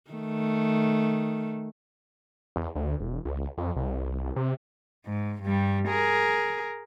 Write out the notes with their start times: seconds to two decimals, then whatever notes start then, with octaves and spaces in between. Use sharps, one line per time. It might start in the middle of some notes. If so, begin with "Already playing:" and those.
0.11 D#3 A3
2.56 E2
2.75 D2
3.00 E1
3.25 C#2
3.58 F2
3.76 C2
4.36 C3
5.06 G#2
5.42 G2 G3
5.88 G#4 A#4